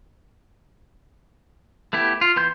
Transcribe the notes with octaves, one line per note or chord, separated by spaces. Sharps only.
A3 B3 E4 G4
F4
E3 B3 C6 G6